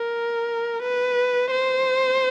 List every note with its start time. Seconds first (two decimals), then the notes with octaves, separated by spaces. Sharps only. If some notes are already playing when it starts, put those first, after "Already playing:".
Already playing: A#4
0.83 B4
1.51 C5